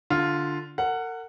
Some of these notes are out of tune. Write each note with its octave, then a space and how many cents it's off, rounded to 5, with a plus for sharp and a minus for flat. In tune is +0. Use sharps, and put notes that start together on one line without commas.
D3 +0 F4 +0
A#4 -40 F#5 +0